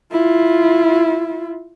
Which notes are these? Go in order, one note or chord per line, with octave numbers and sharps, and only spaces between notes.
E4 F4